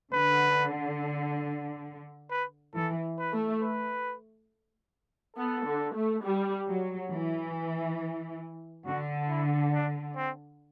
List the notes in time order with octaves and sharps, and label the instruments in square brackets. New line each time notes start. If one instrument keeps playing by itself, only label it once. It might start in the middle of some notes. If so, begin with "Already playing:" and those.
[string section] D3 [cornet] B4
[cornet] B4
[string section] E3 [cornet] A4
[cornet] B4
[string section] A3
[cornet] B4
[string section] B3 [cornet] A4
[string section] D3
A3
G3
F#3
E3
[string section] D3 [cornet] F#4
[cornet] E4
D4
C4